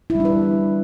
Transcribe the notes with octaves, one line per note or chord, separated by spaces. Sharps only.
E4
G3
D4
B4